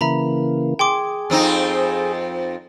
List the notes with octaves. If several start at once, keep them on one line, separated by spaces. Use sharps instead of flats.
C#3 E3 A#3 E5 A#5 B5
G#4 G5 C6 D6
F2 C4 D#4